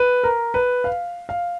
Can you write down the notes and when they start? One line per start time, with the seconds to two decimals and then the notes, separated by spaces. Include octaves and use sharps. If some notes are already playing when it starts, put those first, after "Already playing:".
Already playing: B4
0.24 A#4
0.54 B4
0.84 F5
1.29 F5